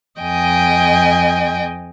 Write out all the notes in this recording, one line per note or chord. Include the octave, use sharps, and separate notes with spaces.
F2 D#5 G5 G#5